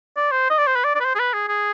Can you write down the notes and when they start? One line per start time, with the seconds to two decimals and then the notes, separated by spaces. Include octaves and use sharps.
0.17 D5
0.31 C5
0.50 D#5
0.58 D5
0.67 C5
0.76 B4
0.85 D5
0.95 D5
1.00 B4
1.05 C5
1.15 G#4
1.20 B4
1.34 G#4
1.49 G#4